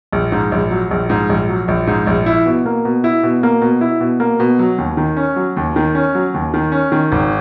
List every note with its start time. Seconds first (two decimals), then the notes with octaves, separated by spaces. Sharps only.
0.12 A#1
0.32 G#2
0.52 A#1
0.71 F#3
0.91 A#1
1.10 G#2
1.29 A#1
1.49 F#3
1.68 A#1
1.87 G#2
2.07 A#1
2.26 E4
2.46 B2
2.66 A#3
2.85 B2
3.04 E4
3.23 B2
3.43 A#3
3.62 B2
3.81 E4
4.01 B2
4.20 A#3
4.40 B2
4.59 F#3
4.78 D#2
4.97 D#3
5.17 C#4
5.36 F#3
5.57 D#2
5.76 D#3
5.95 C#4
6.15 F#3
6.34 D#2
6.54 D#3
6.72 C#4
6.92 D#3
7.12 G#1